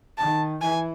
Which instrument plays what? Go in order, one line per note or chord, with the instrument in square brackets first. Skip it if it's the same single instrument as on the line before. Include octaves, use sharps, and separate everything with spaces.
[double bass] D#3 [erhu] A5
[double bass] E3 [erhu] G#5